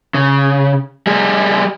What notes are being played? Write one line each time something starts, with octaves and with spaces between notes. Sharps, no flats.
C#3
G3 G#4